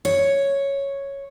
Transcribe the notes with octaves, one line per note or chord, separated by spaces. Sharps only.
C#5